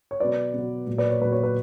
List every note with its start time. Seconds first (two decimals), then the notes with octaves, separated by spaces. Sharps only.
0.11 C#5
0.20 B2 F#3 B4 D5
0.54 B2 F#3
0.87 A#2 F#3
0.98 B4 D5
1.10 C#5
1.21 A#2 F#3 B4
1.32 C#5
1.43 B4